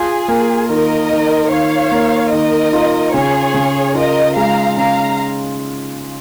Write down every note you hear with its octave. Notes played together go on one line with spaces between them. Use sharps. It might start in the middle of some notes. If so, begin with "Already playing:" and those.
Already playing: F4 G#4
A#3
D#3 A#4 D#5
D#3
D#3 C#5 F5
A#3
D#3 A#4 D#5
F4
C#3 G#4 C#5
C#3
F4 A#4 D#5
G#3 F5 A#5
C#3 F5 A#5